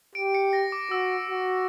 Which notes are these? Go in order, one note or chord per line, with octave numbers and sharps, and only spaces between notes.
G4 D7
C#7
A#6
D6
F#4 E6
F#4